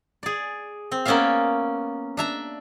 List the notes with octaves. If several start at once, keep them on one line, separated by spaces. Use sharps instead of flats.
G#4 D5
C4
A#3 B3 C#4 D5 E5 F5
D4 E5 A#5